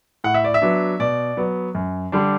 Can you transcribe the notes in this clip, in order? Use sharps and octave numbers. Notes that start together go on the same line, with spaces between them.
A2 F#5
E5
D5
E5
F#3 B3 D4
B2 D5
F#3 B3
F#2
D3 G3 D4